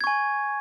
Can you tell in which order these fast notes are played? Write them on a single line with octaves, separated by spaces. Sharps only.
G#6 C#6 G#5